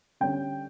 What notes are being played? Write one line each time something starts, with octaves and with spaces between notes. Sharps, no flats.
D3 G3 C#4 G5